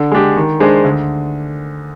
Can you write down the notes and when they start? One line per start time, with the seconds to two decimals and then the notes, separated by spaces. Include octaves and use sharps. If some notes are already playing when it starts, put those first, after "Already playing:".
Already playing: D3
0.12 G#3 D4 G4
0.37 D#3
0.60 G#3 D4 G#4 C5
0.84 D2